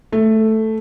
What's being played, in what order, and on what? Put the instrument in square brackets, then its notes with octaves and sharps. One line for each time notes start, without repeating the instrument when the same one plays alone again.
[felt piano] A3